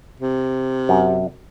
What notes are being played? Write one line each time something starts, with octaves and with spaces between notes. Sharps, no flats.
C3
F#2